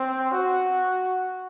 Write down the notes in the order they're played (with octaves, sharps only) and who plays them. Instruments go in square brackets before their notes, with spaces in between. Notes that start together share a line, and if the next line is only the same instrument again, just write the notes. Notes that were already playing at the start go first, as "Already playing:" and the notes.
Already playing: [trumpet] C4
F#4